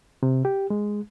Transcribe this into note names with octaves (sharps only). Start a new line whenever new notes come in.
C3
G4
G#3